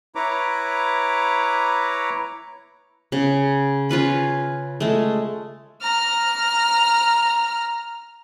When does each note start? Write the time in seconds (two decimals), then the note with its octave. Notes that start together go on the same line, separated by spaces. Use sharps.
0.15 E4 B4 C#5 A#5 D6
3.12 C#3
3.89 C#4 F4 B4 B5
4.80 G#3 A3
5.82 A#5 F6